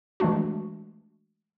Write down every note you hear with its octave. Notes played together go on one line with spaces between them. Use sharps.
E3 G#3 A3 D4 F#4